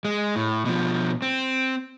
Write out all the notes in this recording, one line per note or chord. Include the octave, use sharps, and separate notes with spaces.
G#3
A2
B2 F3
C4